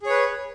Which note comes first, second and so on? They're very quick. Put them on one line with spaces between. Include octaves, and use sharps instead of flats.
G#4 C#5 B4